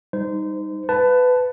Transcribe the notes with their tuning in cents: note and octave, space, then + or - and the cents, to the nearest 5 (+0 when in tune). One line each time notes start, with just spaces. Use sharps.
G3 +20 D#4 +0 C5 -25
B4 +20 F5 +0 A5 +0